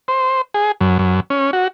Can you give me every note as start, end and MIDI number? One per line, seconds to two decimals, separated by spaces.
0.08 0.41 72
0.54 0.72 68
0.81 0.98 42
0.99 1.20 42
1.30 1.51 61
1.53 1.68 66